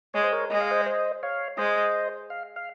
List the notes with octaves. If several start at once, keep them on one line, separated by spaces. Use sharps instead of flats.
G#3 C#5
C5
A#4 C#5
G#3 D#5
F5
C5 D#5
C5 D#5
C#5 F5
G#3 C5 D#5
F5
F5